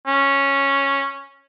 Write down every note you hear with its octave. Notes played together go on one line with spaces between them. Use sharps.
C#4